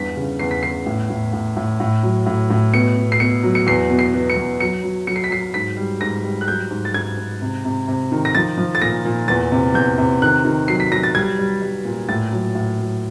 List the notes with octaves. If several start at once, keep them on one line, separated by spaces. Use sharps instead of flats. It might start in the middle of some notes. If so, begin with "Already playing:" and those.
Already playing: E2 G2 B6
C#3
E2 C7
B6
E2 C7
A2
A2
A2
A2
A2
F#3
A2
A2
B2 C#7
B2
C7
B2 C#7
F#3
C#7
E2 C7
B2
C7
B2
C#7
E2
F#3 C#7
F#3
F#3 C#7
C7
B6
F#3 C7
G#2 B6
G3
G#2 A#6
G3
F#6
F#3 G6
G#2
A6
G#2 G#6
G#2
C3
C3
C3
D#3
A#6
F3 A6
F3
A6
A#2 A#6
A#2
E2 A6
C3
E2 G6
C3
D#3 F#6
D#3
F#3 C7
B6
F#3 A#6
A6
G3 G#6
G3
G3
A#2
A2 A6
F#3
A2
F#3